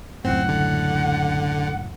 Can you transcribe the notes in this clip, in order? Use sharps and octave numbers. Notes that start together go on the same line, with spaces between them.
C#2 F#2 A2 C4 F#5
D3